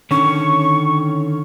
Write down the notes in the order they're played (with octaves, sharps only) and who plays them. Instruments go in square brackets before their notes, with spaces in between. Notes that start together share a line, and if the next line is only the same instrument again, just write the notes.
[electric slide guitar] D3 D#3 C#4 [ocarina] C#6